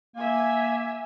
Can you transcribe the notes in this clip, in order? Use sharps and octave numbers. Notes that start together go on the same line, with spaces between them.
A#3 E5 G#5